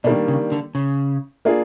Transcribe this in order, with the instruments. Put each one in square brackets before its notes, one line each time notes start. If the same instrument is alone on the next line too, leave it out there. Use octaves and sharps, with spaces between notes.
[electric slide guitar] B2 [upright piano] D#3 G3 A#3 D4
[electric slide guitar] C#3
D3
C#3
[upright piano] A#3 D4 F4 G#4